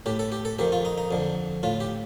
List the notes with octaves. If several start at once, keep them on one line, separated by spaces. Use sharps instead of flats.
A2 G4
A4
G4
A4
F2 D#3 G4
F4
D#4
D#4
F2 D3
A2 F4
G4